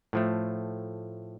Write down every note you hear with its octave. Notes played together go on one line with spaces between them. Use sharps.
A2 F3 A3